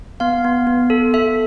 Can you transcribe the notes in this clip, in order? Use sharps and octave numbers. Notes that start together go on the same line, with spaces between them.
B3 F5
B3
B3
A4
A4 E5